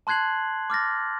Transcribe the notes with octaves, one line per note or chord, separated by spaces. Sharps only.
A5 C6 F#6 G#6 C7 F#7
D6 F6 A6 A#6